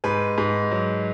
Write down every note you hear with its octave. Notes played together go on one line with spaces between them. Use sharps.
G#2 B4
G#2
F#3